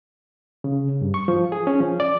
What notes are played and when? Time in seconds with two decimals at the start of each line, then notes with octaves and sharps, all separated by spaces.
0.64 C#3
1.01 G2
1.14 C#6
1.28 F3
1.52 G#4
1.67 C#4
1.81 F3
2.00 D5